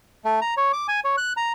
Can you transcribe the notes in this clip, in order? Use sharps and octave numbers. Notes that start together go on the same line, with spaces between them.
A3
A#5
C#5
D6
G#5
C#5
F#6
A#5